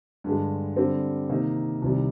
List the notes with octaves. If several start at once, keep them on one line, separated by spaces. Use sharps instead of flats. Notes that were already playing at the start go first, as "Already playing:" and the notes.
G2 D3 G#3
D3 G3 C4
C3 D#3 A#3 D#4
C2 C3 D#3 G3